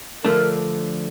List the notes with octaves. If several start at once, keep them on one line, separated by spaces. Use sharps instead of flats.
D3 F3 A3 D4 A#4